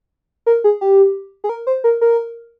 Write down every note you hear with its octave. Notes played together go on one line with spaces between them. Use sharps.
A#4
G#4
G4
G#4
A#4
C5
A#4
A#4